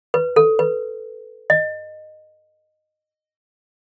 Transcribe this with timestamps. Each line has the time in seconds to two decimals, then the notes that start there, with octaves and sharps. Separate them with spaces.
0.14 B4
0.36 A4
0.59 B4
1.50 D#5